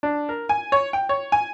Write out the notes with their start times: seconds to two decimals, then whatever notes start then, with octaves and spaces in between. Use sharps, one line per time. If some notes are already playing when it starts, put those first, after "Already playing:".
0.03 D4
0.29 A#4
0.49 G#5
0.72 C#5
0.93 G5
1.09 C#5
1.32 G#5